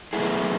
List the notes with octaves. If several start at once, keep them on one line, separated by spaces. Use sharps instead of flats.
B2 F#3 A3 E4 G#4